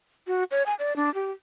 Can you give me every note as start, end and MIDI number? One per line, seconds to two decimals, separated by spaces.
0.27 0.44 66
0.51 0.63 73
0.66 0.74 80
0.79 0.96 74
0.96 1.12 62
1.14 1.32 67